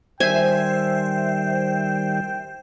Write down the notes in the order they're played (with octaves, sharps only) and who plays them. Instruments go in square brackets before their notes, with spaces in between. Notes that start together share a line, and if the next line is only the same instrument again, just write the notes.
[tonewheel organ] D#3 G3 [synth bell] C5 E5 [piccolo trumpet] G5 [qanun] G#5